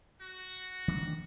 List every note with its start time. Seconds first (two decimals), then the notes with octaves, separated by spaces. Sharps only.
0.21 F#4
0.88 D#3 D4